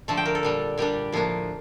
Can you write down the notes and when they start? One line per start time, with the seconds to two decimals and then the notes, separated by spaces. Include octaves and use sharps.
0.08 D3 F3 A3 A5
0.17 G5
0.26 A#4
0.35 A4
0.43 A#2 G3 D4
0.78 A#2 G3 D4 G4
1.12 A2 F3 A#3 D4